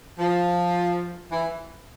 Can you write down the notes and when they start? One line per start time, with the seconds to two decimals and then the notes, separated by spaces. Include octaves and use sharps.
0.19 F3
1.30 E3